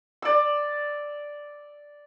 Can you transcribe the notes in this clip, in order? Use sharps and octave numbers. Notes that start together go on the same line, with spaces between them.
D5 E6